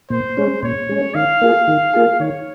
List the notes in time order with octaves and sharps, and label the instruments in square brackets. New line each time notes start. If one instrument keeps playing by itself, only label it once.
[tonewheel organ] A#2 [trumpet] C5
[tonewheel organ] G#3 C#4
[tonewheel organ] A#2 [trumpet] C#5
[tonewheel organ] G#3 C#4
[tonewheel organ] D#3 [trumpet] F5
[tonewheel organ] A#3 F4 G#4
D#3
A#3 F4 G#4
[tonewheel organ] D#3 [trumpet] C#5